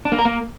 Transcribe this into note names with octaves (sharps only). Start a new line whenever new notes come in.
D4
A#3
A#4
A#3